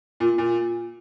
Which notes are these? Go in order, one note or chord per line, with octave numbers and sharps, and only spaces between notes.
A#2
A#2